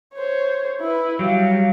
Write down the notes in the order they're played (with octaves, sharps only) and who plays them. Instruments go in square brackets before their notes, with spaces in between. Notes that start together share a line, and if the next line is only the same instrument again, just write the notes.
[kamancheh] C5 C#5
E4 B4
[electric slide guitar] F#3 G3 [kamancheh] F5